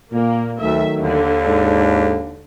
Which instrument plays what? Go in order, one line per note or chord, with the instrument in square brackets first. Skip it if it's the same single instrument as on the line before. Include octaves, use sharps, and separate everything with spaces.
[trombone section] A#2 [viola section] A#3
[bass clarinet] D2 [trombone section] D#3 F#3 A3 [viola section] E5
[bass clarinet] D#2 [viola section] D3
[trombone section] G#2 D4